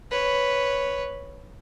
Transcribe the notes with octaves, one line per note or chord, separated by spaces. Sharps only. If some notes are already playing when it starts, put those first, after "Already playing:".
B4 C#5